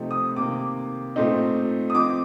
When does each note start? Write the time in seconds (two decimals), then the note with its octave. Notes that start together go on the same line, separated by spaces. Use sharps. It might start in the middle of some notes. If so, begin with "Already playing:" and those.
Already playing: C3 F3 A3 C4 D#4
0.11 D#6
0.36 C3 D#3 A#3 D6
1.16 A#2 A3 C4 D#4
1.90 D#6
1.95 F3 C4 D#4 D6